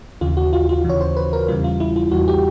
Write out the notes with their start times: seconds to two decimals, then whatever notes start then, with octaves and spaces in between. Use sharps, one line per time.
0.21 D#2 C#3 E3 F4
0.37 F#4
0.53 F4
0.69 F4
0.84 D#2 C#3 E3 C#5
1.01 C5
1.17 B4
1.33 A#4
1.48 E2 C#3 E3 G3 F4
1.64 F4
1.80 E4
1.96 F4
2.11 E2 C#3 E3 G3 F#4
2.28 G4